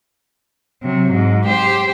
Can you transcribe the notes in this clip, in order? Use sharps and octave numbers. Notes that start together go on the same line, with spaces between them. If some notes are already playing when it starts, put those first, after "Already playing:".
C3 F#3
G#2
G4 C5